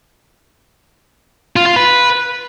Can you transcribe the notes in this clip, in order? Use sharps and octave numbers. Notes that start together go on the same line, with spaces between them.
F4
F4
B4